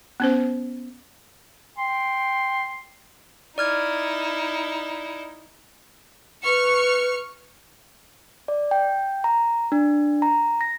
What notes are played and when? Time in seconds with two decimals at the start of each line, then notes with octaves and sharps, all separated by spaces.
0.20 B3 C#4 C5
1.78 G5 C6
3.58 D#4 E4 D5 F6 G#6
6.45 B4 C#6 F6 C#7
8.48 D5
8.71 G5
9.24 A#5
9.72 D4
10.22 A#5
10.61 A#6